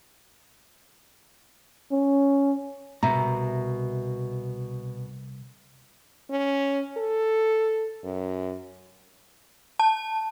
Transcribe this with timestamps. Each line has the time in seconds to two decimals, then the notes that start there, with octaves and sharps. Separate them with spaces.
1.91 C#4
3.03 C2 B2 E5 A#5
6.30 C#4
6.97 A4
8.04 F#2
9.79 A5